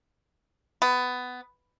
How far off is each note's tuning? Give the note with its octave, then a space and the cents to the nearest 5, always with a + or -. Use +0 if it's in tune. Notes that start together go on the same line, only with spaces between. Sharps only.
B3 +15